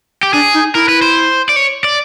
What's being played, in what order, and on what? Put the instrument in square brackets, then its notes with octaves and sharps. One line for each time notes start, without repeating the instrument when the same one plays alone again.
[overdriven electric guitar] G4
[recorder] D4 [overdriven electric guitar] G#4
[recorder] D#4
[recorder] E4 [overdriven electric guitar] A#4
[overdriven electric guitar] B4
C5
D5
C#5
D5